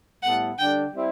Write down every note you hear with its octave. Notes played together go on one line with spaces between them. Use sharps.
A2 G3 B3 E4 A4 F#5
D3 G3 D4 G5
G3 C4 E4 G4